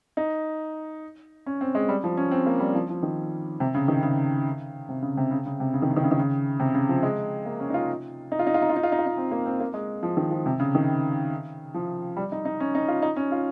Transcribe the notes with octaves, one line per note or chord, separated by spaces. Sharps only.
D#4
C#4
C4
G#3
G3
F3
C#4
C4
A#3
G3
F3
F3
D#3
C3
C#3
D#3
C#3
C3
C#3
C3
C#3
C#3
C3
C#3
D#3
C#3
D#3
C#3
D#3
C#3
C3
C#3
F3
G#3
A#3
C#4
D#4
F4
D#4
F4
D#4
F4
D#4
F4
D#4
F4
D#4
F4
D#4
C4
A#3
C4
A#3
G#3
F3
D#3
F3
C3
C#3
D#3
F3
G3
D#4
D#4
C#4
D#4
F4
D#4
C#4
F4